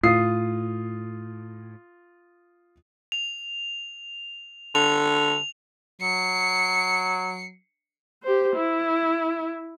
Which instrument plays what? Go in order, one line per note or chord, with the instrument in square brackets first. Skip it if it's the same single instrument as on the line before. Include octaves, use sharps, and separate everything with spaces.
[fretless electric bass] A2 [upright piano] F4 D#6 C7
[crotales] F7
[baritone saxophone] D3 [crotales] F7
[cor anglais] F#3 [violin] C7 C#7
[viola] G4 C5
E4